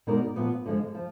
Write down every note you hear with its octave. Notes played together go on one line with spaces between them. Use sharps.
B2 G#3 D#4 A#4 D5
A#2 F3 B3
D3 F3 G#3
F3